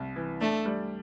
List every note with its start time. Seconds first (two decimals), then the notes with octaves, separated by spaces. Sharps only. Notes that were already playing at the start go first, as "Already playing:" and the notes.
Already playing: C2
0.16 E3
0.41 A3 D4
0.66 G3